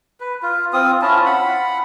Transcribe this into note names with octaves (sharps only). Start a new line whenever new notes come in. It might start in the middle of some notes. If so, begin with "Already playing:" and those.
B4
F4
C4 F4 D#6
C#4 E4 F4 A5
F#5 B5